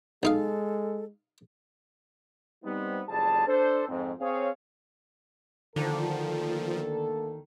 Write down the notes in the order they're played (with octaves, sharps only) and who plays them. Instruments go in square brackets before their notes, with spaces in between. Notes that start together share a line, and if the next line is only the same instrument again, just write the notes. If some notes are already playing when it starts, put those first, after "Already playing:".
[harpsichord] B1 D#4 F5 [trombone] G#3 [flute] A4
[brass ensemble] G3 B3 C4 D#4
F#1 F2 G3 G#4 A5
D4 A4 C5
F2 G#2 C4
C4 G#4 C#5 F5
[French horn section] D2 A#3 A4 [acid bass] D3 [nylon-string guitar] D#3 [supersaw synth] F3